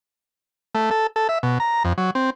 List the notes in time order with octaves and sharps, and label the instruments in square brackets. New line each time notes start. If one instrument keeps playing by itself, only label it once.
[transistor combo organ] A3
A4
A4
E5
B2
A#5
F2
F#3
C4